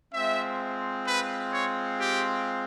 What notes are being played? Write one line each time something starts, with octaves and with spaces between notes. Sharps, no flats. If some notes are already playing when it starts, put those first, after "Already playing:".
G#3 C4 F4 E5
B4
C#5
G4